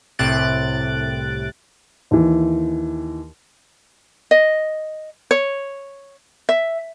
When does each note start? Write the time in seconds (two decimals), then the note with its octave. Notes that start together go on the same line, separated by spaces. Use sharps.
0.19 C2 A2 C3 F#6 A6 D7
2.11 D#2 E3
4.31 D#5
5.31 C#5
6.49 E5